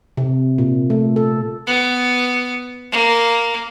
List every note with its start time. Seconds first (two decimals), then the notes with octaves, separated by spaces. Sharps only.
0.17 C3
0.58 A#2
0.90 A3
1.16 A4
1.67 B3
2.92 A#3